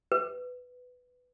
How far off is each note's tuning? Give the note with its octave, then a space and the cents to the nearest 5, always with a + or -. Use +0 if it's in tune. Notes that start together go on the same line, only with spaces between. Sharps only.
B4 +10